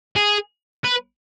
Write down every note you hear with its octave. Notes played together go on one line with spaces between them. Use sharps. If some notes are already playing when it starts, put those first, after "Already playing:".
G#4
B4